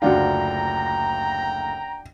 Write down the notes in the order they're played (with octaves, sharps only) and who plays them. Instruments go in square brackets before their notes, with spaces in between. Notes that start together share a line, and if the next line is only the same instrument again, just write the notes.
[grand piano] F#1 D2 F4 [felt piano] D4 F#4 [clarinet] G5 [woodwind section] A#5